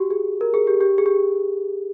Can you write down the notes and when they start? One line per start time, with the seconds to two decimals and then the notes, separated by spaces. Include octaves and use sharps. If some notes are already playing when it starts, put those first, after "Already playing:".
Already playing: F#4 G4
0.11 G#4
0.41 A#4
0.54 G#4
0.67 G4
0.81 G4
0.98 G#4
1.06 G4